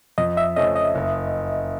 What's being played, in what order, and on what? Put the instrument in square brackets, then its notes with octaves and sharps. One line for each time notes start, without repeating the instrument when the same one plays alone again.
[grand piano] F2 [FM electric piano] D#5
[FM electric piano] E5
[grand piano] C#3 F3 A3 C#4 [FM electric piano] D#5
[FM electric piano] D#5
[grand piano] F#1